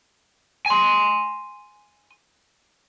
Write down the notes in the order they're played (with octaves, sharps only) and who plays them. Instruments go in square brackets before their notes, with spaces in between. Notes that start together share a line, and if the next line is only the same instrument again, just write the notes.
[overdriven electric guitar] G#5 C6